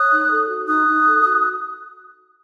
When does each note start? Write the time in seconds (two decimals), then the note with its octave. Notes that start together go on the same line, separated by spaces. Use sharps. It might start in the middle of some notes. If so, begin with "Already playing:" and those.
Already playing: C#5 D#6 F#6
0.10 D#4
0.30 A4
0.48 F#4
0.66 D#4 D#6 F#6
0.86 D#4
1.05 A4
1.23 F#4